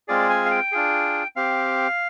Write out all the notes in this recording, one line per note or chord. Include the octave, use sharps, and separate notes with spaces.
G#3 C4 F4 G#4 D5
G#5
F5
G5
D4 F4 G#4
C4 G4 F5